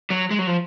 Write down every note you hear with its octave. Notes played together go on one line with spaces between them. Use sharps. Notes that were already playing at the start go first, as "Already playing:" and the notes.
F#3
G#3
F#3
F3